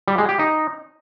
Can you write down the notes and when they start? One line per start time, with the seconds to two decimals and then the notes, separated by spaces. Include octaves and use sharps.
0.08 G3
0.18 G#3
0.29 G4
0.39 D#4